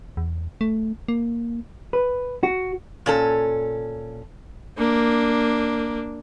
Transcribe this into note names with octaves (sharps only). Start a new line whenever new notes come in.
E2
A3
A#3
B4
F#4
A#2 C#4 A4
A#3 D4